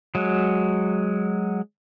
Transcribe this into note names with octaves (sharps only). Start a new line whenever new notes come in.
F#3 G#3